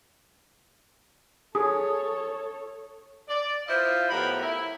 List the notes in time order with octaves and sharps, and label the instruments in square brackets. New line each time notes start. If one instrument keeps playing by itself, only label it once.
[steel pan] G#4 [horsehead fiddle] A4 C#5 [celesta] D#6
[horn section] D5
E4 F4 C5 D#5 F5
A2 F3 B3 G4 A#4 B5
E4